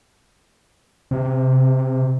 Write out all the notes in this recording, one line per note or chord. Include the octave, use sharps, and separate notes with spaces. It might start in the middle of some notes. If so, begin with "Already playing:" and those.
C3